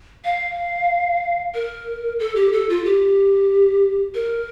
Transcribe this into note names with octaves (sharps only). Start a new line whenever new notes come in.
F5
A#4
A4
G4
A4
F4
G4
A#4